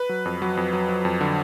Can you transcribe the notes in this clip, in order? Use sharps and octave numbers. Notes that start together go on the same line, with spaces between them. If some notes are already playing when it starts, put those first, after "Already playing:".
Already playing: B4
F#3
F2
F#3
F2
F#3
F#3
F2
D3